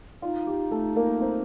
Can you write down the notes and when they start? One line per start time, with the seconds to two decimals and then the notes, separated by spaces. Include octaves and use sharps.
0.22 D#4 F4
0.47 G4
0.71 A3 A4
0.96 A#3 A#4
1.20 C4 C5